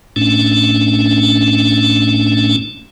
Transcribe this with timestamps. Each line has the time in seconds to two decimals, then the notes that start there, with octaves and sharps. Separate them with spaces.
0.16 A2 A3 C#4 D4